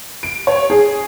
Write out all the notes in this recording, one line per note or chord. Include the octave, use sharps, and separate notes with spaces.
D7
C#5
G#4